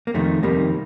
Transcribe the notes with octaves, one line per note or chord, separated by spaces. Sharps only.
A#3
F2 C3 D#3 A3
F2 C3 D#3 G3 A#3